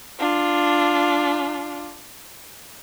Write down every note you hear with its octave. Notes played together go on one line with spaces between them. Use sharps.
D4 F4